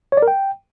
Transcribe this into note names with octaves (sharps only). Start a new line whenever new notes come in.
C#5
D5
A#4
G5